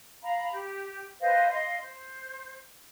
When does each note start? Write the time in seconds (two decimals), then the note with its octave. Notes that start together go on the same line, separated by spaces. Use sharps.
0.23 F5 A#5 B5
0.52 G4
1.20 B4 C5 D#5 F5
1.50 D#5 F5 C6
1.83 C5